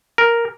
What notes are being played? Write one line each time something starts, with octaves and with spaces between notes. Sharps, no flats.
A#4